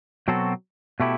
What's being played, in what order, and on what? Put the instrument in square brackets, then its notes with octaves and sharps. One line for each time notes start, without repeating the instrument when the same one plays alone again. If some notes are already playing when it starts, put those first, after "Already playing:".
[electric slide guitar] B2 F#3 C4 F#4 A4
B2 A3 E4 G4